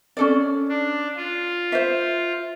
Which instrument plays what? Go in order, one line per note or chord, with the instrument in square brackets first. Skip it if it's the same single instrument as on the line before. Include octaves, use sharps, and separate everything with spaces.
[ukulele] C#4 A4 D5
[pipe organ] D4
F4
[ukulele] C5 E5